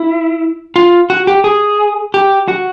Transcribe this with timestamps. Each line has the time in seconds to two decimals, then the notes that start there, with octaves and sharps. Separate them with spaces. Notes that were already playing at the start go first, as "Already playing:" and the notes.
Already playing: E4
0.76 F4
1.10 F#4
1.27 G4
1.44 G#4
2.14 G4
2.48 F#4